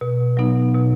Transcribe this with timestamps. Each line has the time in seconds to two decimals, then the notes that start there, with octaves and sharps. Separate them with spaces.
0.01 B2
0.37 F#3 B3 D#4
0.74 B2